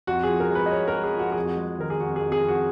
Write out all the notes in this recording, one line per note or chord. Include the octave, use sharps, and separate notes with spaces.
F2 F#4
G#4
F3
A#4
G#3 B4
D#5
G#3 C#5
A#4
G#3
G#4
F3
F#4
F2 G#4
F#4
G#3
D#3 A#4
G#4
F2 F#4
G#4
F2
G#4
F2
F#4